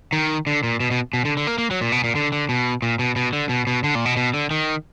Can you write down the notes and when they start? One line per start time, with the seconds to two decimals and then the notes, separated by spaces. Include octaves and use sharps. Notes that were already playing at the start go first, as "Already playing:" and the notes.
0.13 D#3
0.47 D3
0.63 A#2
0.80 B2
0.91 B2
1.13 B2
1.25 D3
1.37 D3
1.47 A#3
1.58 A#3
1.71 F#3
1.81 A#2
1.92 B2
2.04 A#2
2.15 D3
2.32 D3
2.49 B2
2.82 A#2
2.99 B2
3.16 B2
3.33 D3
3.49 B2
3.67 B2
3.84 D3
3.95 A#2
4.05 B2
4.17 B2
4.34 D3
4.51 D#3